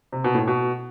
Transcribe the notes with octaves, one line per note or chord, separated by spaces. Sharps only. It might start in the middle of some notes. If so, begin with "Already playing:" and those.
C3
B2
A2
B2